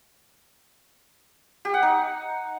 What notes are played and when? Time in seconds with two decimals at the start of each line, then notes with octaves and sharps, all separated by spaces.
1.65 G4
1.74 F#5
1.83 D#4